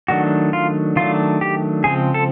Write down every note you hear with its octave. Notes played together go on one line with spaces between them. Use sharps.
D#3 F#3 A3 D4 F#4
F4
D#3 F#3 A3 D4 F4
G4
C#3 F3 G#3 C4 G#4
A4